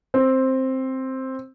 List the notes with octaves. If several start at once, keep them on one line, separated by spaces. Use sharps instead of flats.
C4